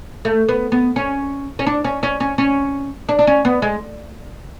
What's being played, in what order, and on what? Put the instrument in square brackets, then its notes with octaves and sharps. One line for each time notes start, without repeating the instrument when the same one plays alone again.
[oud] A3
B3
B3
C#4
C#4
D4
C#4
C#4
C#4
C#4
D4
D4
C#4
B3
G#3